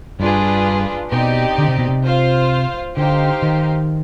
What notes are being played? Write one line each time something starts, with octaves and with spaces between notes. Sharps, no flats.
G2 D4 F4 G#4 B4
B2 C4 D#4 G4 D5
D3
C3
B2
C3
F4 C5 F5
D3 D#4 G4 C5 F5
D#3